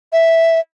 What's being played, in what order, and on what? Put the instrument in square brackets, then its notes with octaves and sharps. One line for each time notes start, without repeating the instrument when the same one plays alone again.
[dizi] E5